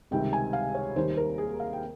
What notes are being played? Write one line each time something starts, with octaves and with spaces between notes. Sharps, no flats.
C#2 C3 D#3 G3 G5
G#5
F5
C#5
D#2 D#3 G3 C5
A#4
G#4
F5
G5